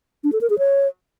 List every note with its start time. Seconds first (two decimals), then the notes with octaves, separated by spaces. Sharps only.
0.24 D4
0.33 A4
0.41 A#4
0.50 G#4
0.59 C#5